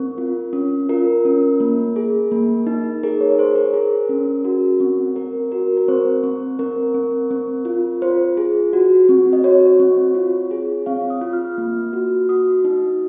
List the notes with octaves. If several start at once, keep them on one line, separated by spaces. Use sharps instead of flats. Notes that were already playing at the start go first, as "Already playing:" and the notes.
Already playing: C4 A#4
F4
C#4
F4 A#4
C#4
A#3
G#4
A#3
D#4
G#4 A#4
C#5
G#4 C5
A#4
G#4
C#4
F#4
C4
C4 A#4
F#4 A#4
A#4
C4 C5
C4
C4 A#4
C4
C4
F4
F4 C5
G#4
F#4
C4
D#5
F#4 C#5
C4
F4
G#4
C4 F5
D#6
F4
F6
A#3
F#4
F#4 D#6
D#4